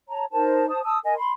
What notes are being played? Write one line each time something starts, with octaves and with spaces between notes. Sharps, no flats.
C#5 A5 A#5
D#4 A#4 C5 A5
C5 A5 D#6
A5 D#6 E6
A#4 D#5 G#5
B5 C6